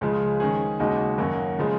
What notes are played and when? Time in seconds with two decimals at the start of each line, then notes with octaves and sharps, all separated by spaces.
0.01 C#2 C#3 F3 G#3
0.40 D#3 G#3 C#4 G#4
0.80 D#2 C#3 G#3 D#4 F#4
1.18 F#2 D#3 A#3 C#4 F#4
1.59 C#3 F3 G#3